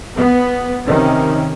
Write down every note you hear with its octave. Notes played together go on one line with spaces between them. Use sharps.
B3
C3 D#3 C#4